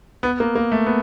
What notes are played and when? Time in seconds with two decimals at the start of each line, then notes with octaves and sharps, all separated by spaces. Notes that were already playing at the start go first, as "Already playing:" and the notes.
0.23 B3
0.40 A#3
0.55 A#3
0.72 A3
0.86 B3